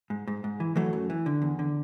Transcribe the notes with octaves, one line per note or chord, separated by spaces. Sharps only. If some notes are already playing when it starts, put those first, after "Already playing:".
G#2
G#2
G#2
E3
E3 F#3 A3
F#2
E3
D3
E2
D3